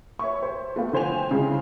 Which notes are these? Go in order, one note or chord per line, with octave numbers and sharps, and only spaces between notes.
C#5 E5 C#6
C5
A3 B3 F5
D3 F3 C5 G5 G#5 F7
C#3 G#3 E4